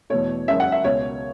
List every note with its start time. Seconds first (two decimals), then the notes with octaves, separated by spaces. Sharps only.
0.10 E2 B2 A3 C#5
0.48 F#1 F#2 C#3 G#3 E5
0.60 F#5
0.72 E5
0.84 C#2 B2 G#3 C#5